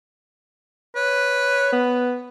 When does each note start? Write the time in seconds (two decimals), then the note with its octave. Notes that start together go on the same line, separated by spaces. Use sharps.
0.96 B4 C#5
1.72 B3